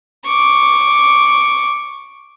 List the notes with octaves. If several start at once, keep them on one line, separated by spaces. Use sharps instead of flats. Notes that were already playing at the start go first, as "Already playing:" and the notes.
C#6 D6